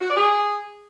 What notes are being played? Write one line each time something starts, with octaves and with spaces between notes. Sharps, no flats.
F#4
D5
G#4